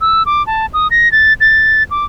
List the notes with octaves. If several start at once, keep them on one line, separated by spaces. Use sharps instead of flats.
E6
D6
A5
D#6
A#6
A6
A6
D6